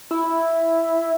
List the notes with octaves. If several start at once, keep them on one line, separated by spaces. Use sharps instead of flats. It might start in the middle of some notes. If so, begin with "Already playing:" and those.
E4